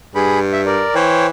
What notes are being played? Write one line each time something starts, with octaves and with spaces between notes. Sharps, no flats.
G2 G#4 B5
E5
A#4 D5
E3 C5 C#5 G5